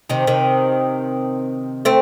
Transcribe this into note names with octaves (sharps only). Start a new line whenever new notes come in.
C3 D#3
C3 D#3
A3 C4